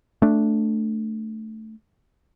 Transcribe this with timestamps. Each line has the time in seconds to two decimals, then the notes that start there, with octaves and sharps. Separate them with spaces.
0.22 A3 D4